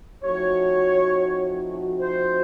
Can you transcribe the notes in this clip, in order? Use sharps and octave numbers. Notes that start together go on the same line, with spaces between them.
F3 A3 C4 D#4 F#4 C#5
C5